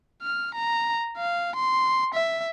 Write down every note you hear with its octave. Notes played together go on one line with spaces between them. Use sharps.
F6
A#5
F5
C6
E5